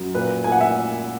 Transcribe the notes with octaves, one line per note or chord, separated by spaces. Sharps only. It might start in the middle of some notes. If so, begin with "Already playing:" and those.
Already playing: F#2 F#3
A#2 B4
A#2 G#5
F#5
E5